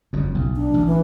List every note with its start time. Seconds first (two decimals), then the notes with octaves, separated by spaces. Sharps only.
0.13 F#1 F2
0.35 B1
0.56 D4
0.74 A1
0.87 E3